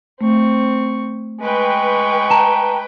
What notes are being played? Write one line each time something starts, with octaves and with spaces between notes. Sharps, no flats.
A3 C4 C#6
G#3 B4 G5 C#6
A5 A#5 E7